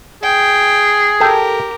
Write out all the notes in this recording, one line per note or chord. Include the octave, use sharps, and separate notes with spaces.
G#4 G5
G4 A4 A#4 G5